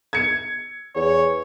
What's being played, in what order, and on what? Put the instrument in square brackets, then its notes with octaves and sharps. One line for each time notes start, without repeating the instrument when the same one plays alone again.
[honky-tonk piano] G#6 C#7
[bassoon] E2 [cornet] C#5